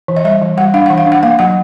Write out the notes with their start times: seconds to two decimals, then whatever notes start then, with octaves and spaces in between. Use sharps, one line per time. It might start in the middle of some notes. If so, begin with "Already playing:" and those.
0.08 E3
0.17 D#5
0.24 G3 E5
0.41 E3
0.57 G3 F#5
0.74 D4 F5
0.86 E3 F#5
0.98 F5
1.06 D4
1.12 F#5
1.23 A#3 F5
1.39 F#3 F#5